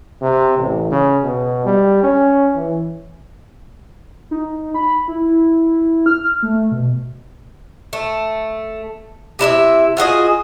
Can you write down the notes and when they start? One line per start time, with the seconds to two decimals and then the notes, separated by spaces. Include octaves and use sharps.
0.22 C3
0.58 A1
0.91 C#3
1.24 B2
1.66 G3
2.03 C#4
2.56 E3
4.31 D#4
4.74 B5
5.08 E4
6.06 F6
6.43 A3
6.71 B2
7.93 A3
9.39 C3 E4 F4 E5
9.97 F4 F#4 G#4 D#5